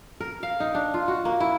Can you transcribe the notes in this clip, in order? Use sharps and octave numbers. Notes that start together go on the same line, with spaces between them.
A#4
F5
D#4
D4
F4
F#4
A#3
E4